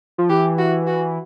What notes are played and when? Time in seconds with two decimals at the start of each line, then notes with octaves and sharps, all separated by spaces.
0.18 F3
0.29 E3 G4
0.58 F#4
0.87 F#4